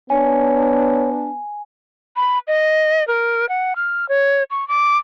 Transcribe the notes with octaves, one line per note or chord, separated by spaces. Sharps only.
B3 D4 C#5 G#5
B5
D#5
A#4
F#5
F6
C#5
C#6
D6